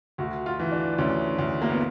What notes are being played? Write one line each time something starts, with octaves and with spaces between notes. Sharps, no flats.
D2 F#4
F4
E3
D4
D2 C#4
D2
A#3
B3